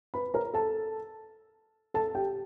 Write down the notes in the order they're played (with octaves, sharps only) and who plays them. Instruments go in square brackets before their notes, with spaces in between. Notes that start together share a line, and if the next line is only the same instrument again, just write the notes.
[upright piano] B4 B5
A#4 A#5
A4 A5
A4 A5
G4 G5